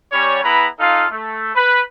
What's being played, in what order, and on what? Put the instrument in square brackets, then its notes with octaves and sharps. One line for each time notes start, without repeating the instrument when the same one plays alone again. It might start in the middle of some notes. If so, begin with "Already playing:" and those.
[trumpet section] G3 C#4 C#5
B3 E4 G#4 B4 A#5 B5
D#4 F4 A4 F5
A3
B4